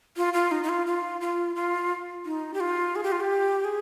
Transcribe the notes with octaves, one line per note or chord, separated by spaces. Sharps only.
F4
F4
D#4
D#4
F4
F4
F4
F4
D#4
G4
F4
G#4
G4
F4
G4
G#4